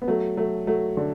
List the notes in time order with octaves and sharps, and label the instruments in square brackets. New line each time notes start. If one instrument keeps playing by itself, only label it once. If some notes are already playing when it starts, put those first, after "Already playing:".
[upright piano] B3
F#3 A3
F#3 A3
F#3 A3
D3